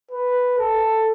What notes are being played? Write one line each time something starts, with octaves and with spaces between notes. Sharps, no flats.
B4
A4